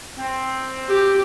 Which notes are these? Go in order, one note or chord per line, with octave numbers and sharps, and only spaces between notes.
C4
G4